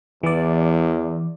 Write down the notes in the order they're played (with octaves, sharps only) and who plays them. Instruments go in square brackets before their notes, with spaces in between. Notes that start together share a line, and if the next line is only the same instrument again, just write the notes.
[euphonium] E2 [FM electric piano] E3 D5